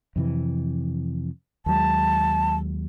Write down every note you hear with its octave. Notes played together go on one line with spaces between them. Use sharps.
F2 C3 E3
D#2 F#3 G#3 A5